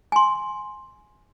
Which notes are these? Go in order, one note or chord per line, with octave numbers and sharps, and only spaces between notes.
G#5 C6